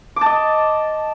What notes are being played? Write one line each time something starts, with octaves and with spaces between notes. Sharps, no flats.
D#5 A5 D6